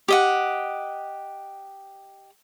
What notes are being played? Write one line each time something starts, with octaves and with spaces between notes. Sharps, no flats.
G4 D#5 F#5